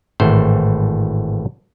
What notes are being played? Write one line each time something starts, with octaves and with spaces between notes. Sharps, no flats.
G#1 A2 E3 C5